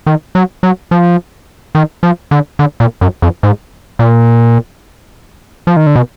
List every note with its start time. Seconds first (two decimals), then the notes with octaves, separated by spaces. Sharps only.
0.06 D#3
0.35 F#3
0.63 F#3
0.91 F3
1.75 D#3
2.03 F3
2.31 D3
2.59 D3
2.80 A#2
3.01 F#2
3.22 F2
3.43 G#2
3.99 A#2
5.67 F3
5.76 D#3
5.86 D3
5.96 B2